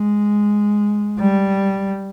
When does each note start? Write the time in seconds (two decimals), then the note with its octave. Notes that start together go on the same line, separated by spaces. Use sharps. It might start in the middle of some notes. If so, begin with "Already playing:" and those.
Already playing: G#3
1.19 G3